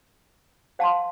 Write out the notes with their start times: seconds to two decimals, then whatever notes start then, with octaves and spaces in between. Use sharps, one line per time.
0.79 C5 F5 A5 C6